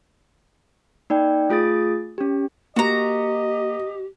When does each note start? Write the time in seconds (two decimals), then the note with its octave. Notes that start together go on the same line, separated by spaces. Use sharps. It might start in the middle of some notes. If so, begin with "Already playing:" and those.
1.10 A#3 D#4 D5 G5
1.50 A3 F4 G#4 D#6 A6
2.18 C#4 G4
2.76 A#3 F#4 G4 D#5 A#5